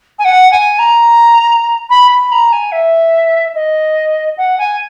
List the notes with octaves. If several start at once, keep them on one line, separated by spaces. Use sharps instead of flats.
G#5
F#5
G#5
A#5
B5
B5
A#5
G#5
E5
D#5
F#5
G#5